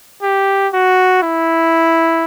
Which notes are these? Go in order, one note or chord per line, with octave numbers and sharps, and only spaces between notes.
G4
F#4
E4